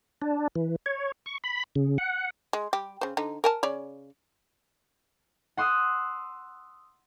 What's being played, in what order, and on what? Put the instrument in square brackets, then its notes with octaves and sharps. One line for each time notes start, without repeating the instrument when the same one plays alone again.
[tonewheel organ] D4
E3
C#5
C#6
B5
C#3
F#5
[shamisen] G#3
G3 G4
C#3 C5
D3 D#4
A#4 G#5 A5
C#3 C#5 D5
[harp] F#5 C6 D#6 E6